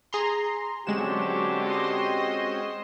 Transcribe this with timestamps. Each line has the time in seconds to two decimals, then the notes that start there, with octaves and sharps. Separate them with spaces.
0.13 G#4 A#5 C6
0.87 D3 F#3 G#3 C4 C#4 F#4 G4 E7
1.65 D#5 C6